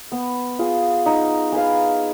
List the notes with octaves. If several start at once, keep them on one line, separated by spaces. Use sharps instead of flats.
B3
F4 G#4
D#4
G#4 B4 F5